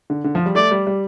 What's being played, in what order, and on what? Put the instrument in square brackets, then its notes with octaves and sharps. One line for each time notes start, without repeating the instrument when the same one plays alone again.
[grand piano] D3
D3
F3
G3
[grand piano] A3 [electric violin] D5
[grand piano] G3
G3